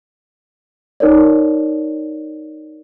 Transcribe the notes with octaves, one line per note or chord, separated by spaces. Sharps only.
D#4 A#4 C#5 D5